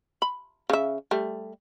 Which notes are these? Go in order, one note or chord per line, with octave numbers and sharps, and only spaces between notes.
B5
C#3 E5
G3 A3